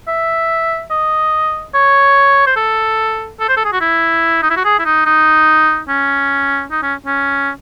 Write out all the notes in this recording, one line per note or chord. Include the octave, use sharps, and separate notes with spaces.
E5
D#5
C#5
C5
A4
A4
C5
A4
G#4
F#4
E4
D#4
E4
F#4
G#4
E4
D#4
D#4
C#4
D#4
C#4
C#4